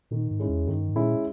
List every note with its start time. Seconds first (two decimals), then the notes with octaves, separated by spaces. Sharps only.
0.11 A#2 D#3
0.31 G#2
0.40 G#3 C#4 E4
0.49 E2
0.67 G2 D#3
0.89 G#2
0.96 A#2 G#3 C#4 E4